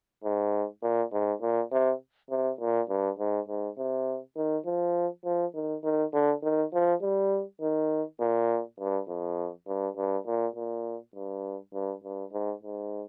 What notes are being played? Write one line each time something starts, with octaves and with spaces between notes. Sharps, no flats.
G#2
A#2
G#2
A#2
C3
C3
A#2
G2
G#2
G#2
C3
D#3
F3
F3
D#3
D#3
D3
D#3
F3
G3
D#3
A#2
G2
F2
G2
G2
A#2
A#2
G2
G2
G2
G#2
G#2